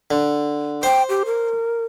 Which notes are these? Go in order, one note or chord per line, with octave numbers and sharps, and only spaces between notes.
D3
C5 G5
G4
A#4